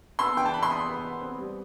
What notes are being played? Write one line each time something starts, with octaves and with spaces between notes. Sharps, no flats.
B3 C6 E6
E3 G5
A5
B3 B5
C6
B3 B5 D#6
B3
B3
C4
G3